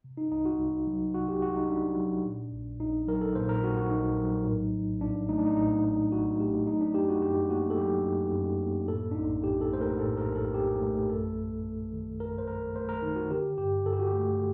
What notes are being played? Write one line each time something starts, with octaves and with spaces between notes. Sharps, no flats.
C3
D#4
C2 D#4
F#4
C2
F#3
C3 F#4
G4
C2 F#4
D#4
C2 D4
F#3
A#2
A#1
A#1 D#4
F#3 A#4
A4
A#2 C5
A#4
A#1 F#4
F#4
A#1 D#4
F#3
A2
A1
A1 D4
A3 D#4
D4
D#4
A2 D#4
A1 D#4
A1 F#4
A3 G4
F#3 D#4
D4
F#2 G4
F#4
F#2 G4
A#3 F#4
A4
F#3 G4
F#2
F#2
A#3
A2 A4
D4
A#1 D#4
A#1 G4
A4
A3 C5
A#4
A2 A4
A#4
A#1
A4
A#1 G4
A3
G4
F#2 A4
G1
A3
D#3
F#2 A#4
C5
G1 A#4
A3 C5
A#4
D#3 D#4
F#4
D3 G4
G2 G4
G2 A4
G4
F#4
G4
A3